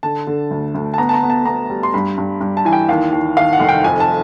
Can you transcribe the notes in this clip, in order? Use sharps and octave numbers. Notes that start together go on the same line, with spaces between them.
D3 A5
D3
D2
D2
A5
B3 A#5
A5
A#5
B3
A5
B3 A#5
G3
C6
G2 B5
G2
G2
A5
E3 G#5
G5
D#2 F5
D#2
D#3 F5
F#5
F1
G5
F2 G#5
A5